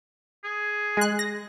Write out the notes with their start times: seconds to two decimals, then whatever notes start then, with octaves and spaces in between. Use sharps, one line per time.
0.44 G#4
0.97 G#3 F#6
1.19 A#6